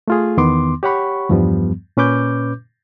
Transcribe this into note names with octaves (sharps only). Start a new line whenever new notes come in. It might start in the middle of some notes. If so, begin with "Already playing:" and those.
A3 F4 G#4
E2 D#3 B3 C6 D6
G4 C#5 F#5 B5 C#6
E2 G2 F3 G3 B3
A#2 C#4 B4 D6 G6